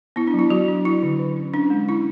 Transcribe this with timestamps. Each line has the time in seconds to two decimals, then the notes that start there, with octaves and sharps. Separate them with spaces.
0.16 B3 E4
0.27 D4
0.34 F#3
0.39 E4
0.50 F#3 F#4
0.68 D4
0.85 F#3 E4
1.03 D3
1.19 D3
1.36 C#4
1.54 C#4 D4
1.70 G#3
1.89 C#4 E4